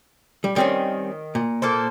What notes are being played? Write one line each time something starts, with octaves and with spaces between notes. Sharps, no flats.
G3
D#3 G3 C4 C#4
A#2
A#3 A4 C5